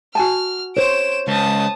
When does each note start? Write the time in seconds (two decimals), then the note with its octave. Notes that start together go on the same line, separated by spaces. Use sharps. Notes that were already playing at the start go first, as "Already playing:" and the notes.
0.15 F#4 G#5 A5 F6
0.77 C5 C#5 D7 E7
1.28 C#2 A5 D#6